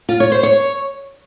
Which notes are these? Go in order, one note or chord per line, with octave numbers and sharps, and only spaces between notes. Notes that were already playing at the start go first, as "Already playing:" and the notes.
F4
C#5
C5
C#5